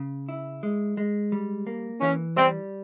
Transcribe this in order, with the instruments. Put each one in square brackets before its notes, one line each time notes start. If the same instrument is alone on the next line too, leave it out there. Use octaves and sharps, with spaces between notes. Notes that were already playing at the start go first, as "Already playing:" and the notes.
Already playing: [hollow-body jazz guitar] C#3
E4
G#3
G#3
G3
A#3
[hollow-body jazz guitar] E3 [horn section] C#4
[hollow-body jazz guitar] G3 [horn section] C4